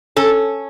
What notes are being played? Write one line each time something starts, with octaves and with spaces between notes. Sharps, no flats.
C#4 A4